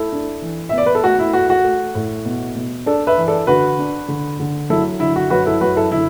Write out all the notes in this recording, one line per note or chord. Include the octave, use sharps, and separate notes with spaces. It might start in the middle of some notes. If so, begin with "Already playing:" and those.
Already playing: A3 E4 A4
D4
E3
E5
B3 D5
B4
A4
A3 F#4
E4
A3 F#4
F#4
A3
A2
B2
B2
D4 A4 D5
B4 E5
E3
A4 D5
D3 F#4 B4
D4
D3
D3
F#3 E4 A4
D3 E4
F#4
F#2 F#4 B4
E4 A4
F#2 F#4 B4
E4 A4
D3 E4